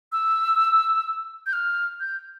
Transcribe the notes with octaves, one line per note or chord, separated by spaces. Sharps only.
E6
G6
F6
G6